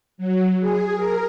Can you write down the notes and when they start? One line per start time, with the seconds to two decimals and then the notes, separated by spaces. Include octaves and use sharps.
0.18 F#3
0.60 G#4
0.95 A#4